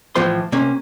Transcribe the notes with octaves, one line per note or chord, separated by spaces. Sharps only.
A2 E3 F3 C5 C6
C3 A#3 C#4